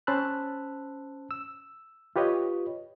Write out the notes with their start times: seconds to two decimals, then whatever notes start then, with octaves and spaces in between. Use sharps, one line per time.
0.07 C#4 C5 A5 B5 E6 F#6
1.31 E6
2.16 F4 G4 B4 C#5 D#5